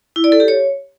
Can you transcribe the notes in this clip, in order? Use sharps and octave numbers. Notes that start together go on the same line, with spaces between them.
E4
D5
A4
G4
C#5